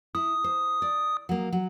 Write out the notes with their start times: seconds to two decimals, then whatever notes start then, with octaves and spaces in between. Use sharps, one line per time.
0.15 E4 D#6
0.44 C5
0.82 D5
1.29 F#3 A#3
1.52 F#3